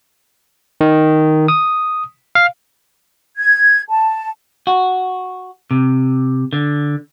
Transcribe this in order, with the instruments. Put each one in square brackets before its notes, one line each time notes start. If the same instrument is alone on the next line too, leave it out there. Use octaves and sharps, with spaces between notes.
[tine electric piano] D#3
D#6
F5
[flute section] G#6
A5
[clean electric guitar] F#4
C3
D3